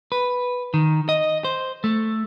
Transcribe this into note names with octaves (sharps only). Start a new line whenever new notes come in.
B4
D#3
D#5
C5
A3